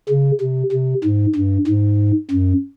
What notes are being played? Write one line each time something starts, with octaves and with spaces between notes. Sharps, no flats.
C#3
C3
C3
G#2
G2
G#2
F#2